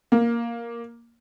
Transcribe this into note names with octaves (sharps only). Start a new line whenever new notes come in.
A#3